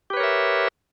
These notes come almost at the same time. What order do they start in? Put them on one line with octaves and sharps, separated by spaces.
G4 B4 C#5 A#4 E5